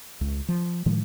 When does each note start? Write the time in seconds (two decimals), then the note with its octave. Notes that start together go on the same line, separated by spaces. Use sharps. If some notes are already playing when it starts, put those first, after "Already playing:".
0.21 C#2
0.48 F3
0.86 A2 D#3 F3 G#3